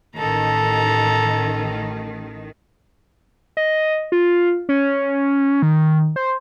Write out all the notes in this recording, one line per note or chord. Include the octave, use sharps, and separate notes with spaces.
A1 D#3 A4 A#5
D#5
F4
C#4
D#3
C5